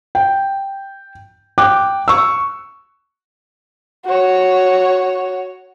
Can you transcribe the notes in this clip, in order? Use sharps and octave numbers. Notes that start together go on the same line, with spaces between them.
G5
G5 D6 F#6
C#6 E6
F#4 C#5